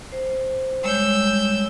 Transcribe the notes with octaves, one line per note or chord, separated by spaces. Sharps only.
C5
G3 G#3 C#5 E6 G6